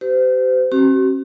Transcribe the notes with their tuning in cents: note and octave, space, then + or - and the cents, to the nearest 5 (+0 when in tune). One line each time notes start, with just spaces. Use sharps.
G4 -25 C5 -40
C4 +45 F#4 +40